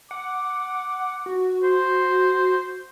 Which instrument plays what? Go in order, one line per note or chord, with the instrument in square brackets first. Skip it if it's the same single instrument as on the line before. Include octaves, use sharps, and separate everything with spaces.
[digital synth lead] F#5 [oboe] D6
[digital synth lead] F#4
[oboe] C5